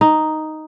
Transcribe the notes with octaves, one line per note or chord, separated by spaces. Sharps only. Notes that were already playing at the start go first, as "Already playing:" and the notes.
D#4